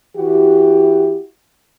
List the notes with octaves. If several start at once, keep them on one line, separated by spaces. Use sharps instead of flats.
E3 E4 F#4 G4